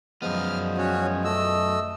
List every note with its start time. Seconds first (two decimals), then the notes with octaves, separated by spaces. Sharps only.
0.22 F#2 F3 G#3 B3 F6
0.78 C#4 F#4 C#5
1.24 A3 D#5 E6